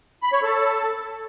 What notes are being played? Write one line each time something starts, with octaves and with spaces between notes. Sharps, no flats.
B5
C#5
A4